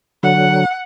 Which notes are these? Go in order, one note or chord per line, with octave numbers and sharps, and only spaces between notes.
D3 F#3 F#5